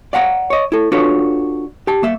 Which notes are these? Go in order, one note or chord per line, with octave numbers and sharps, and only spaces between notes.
D5 F5 F#5 A#5
C#5 D#5
E4 A4
D4 F4 F#4 A4 B4 C#5
G4 A5
A#3 E5